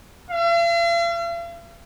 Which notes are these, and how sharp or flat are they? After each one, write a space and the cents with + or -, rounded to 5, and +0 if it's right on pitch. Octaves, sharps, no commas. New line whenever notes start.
F5 -45